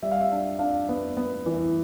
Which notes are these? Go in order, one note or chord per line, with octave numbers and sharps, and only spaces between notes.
G3 E5
F5
E5
D4
D4 F5
B3
B3
E3